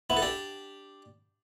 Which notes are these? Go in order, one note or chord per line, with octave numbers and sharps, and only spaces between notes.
B3 E4
A4
D4 G4